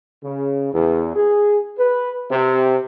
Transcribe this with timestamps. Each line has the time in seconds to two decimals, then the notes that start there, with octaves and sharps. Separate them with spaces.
0.24 C#3
0.73 E2
1.16 G#4
1.77 B4
2.30 C3